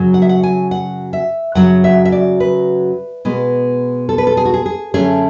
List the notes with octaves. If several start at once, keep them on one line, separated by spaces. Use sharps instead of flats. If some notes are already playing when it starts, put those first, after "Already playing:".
Already playing: F#2 C#3 F#3
F#5
E5
F#5
G#5
F#5
E5
F#2 C#3 F#3 F#5
E5
E5
D5
B4
B2 G#3 B3
A4
B4
A4
G#4
F#4
G#4
G#4
F#2 D3 A3 C#4 G#4